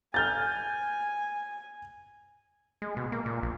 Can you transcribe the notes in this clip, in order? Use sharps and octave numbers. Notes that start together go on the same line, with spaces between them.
G#5 F6 G6 A6
G#3
B2
A#3
A#2
A#1